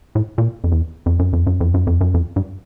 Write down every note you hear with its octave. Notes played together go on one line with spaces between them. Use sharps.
A2
A#2
F2
E2
F2
F#2
F2
F#2
F2
F#2
F2
F#2
F2
G2